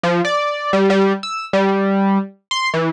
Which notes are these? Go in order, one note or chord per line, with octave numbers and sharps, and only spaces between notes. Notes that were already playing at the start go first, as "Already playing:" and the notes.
F3
D5
G3
G3
E6
G3
C6
E3